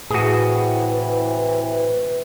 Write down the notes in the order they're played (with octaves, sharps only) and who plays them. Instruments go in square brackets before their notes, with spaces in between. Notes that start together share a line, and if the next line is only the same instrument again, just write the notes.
[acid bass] A2 [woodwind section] C3 E3 [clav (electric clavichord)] F#4 G#4 [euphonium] B4